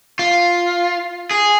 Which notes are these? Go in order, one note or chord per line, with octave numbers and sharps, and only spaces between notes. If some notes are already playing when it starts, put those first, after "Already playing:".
F4
G#4